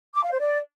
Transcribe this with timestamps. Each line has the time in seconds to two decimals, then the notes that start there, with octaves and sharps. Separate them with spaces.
0.15 D6
0.23 F5
0.32 C5
0.40 D5